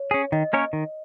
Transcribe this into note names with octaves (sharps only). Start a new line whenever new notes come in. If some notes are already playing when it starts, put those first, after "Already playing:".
Already playing: C#5
C#4 G#4
D#3 D#5
A#3 C#4 A#4 C#5
D#3